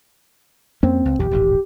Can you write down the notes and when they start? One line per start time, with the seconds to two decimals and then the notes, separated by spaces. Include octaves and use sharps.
0.83 F2 A#3 C4 C#4
1.05 C#2
1.19 A#1 E2 G4
1.31 D#1 A1 G#2